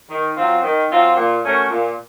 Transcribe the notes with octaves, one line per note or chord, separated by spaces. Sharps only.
D#3
F#3 C4 F4
D#3
F#3 C4 F4
A#2
A3 C#4 F#4 A#4
A#2